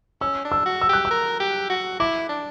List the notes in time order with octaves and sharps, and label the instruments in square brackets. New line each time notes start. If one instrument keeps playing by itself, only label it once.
[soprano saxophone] C#4 [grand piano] E6
[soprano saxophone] D4
[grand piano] E6
[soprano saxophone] F#4
[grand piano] E6
[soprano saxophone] G4 [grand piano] F#6
[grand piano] E6
[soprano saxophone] A#4
G4
F#4
[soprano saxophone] E4 [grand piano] D6
[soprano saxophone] D4